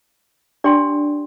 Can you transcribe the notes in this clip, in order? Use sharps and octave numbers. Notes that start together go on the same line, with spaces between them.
D4 G4 D5 G5 C6